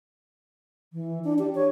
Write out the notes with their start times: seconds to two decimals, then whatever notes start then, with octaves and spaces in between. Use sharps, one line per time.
0.93 E3
1.24 D4
1.39 G4
1.55 C#5